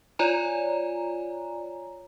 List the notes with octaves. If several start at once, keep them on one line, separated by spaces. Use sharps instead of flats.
F4 C#5 D5 G#5 A#5